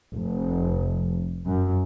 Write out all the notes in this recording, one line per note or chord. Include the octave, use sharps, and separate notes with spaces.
F1
F#2